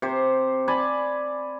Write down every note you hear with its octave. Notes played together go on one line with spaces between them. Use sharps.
C3 C5
D5 G#5 A5 B5